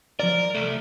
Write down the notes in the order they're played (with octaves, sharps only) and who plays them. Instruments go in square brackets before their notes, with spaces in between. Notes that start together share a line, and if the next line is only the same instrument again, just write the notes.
[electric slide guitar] F3 D5 [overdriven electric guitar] A#4
[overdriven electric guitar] C2 [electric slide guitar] A3